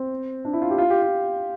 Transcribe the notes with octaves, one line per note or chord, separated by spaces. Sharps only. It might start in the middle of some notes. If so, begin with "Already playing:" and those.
Already playing: C4
D4
E4
F4
G4
F4
G4
F4